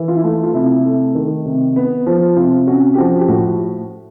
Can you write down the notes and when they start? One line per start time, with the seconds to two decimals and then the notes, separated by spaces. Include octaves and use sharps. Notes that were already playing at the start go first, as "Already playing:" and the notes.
Already playing: E3
0.08 F4
0.16 E4
0.23 A3 F4
0.43 F4
0.54 C3 E4
0.84 A3
1.15 D#3
1.45 C3
1.76 B3
2.06 F3
2.36 C3 F4
2.67 C#4 F#4
2.94 G4
2.98 F3 F#4
3.19 G4
3.28 A2 F#4